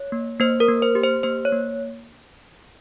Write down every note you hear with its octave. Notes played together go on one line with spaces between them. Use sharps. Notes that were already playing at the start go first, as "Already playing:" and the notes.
Already playing: C#5
A#3
A#3 C5
A#4
A#3
C5
G4
C5
A#3 C5
C#5
A#3